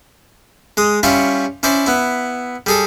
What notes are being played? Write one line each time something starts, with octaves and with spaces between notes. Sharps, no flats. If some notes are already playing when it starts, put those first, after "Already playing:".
G#3 D#6
G3 C#4 E4 F4 C#5
C#4 E4 C5 D5
B3 E4
G3 G#4 A4